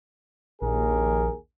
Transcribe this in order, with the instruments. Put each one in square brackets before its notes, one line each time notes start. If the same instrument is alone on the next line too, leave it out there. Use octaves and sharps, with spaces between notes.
[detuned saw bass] A#1 [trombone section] D#2 G#4 A#4